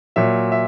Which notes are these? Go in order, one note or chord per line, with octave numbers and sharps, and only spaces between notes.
A#2 F#3 E5
E5